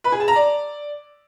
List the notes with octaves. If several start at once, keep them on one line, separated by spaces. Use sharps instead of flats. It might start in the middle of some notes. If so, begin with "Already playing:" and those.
B4
G#4
A5
A#5
D5